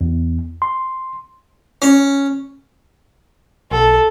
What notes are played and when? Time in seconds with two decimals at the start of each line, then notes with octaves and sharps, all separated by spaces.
0.01 E2
0.62 C6
1.82 C#4
3.71 B1 A4